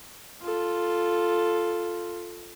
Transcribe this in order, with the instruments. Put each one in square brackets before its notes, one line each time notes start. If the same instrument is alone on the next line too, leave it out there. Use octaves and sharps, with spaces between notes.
[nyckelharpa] F4 A4